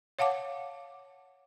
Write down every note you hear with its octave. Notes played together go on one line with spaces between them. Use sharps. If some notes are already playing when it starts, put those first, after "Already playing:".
C#5 F5 F#5 A5 D6